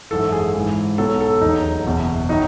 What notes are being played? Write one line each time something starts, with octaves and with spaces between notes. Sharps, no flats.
G#1 F#2 E3 A4
G#4
G#1 G#2 E3
B1 B2 F#3 A4
A4
E1 D#2 D#3 F#3 D#4
F#1 E2 B2
D#3 F#3 D#4